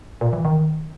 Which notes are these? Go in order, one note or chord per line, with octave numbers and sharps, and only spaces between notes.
A#2
E3
D#3